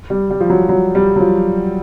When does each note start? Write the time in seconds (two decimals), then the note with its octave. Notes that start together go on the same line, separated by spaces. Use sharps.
0.10 G3
0.30 G3
0.40 F3
0.50 F#3
0.69 F#3
0.95 G3
1.16 F#3
1.20 F3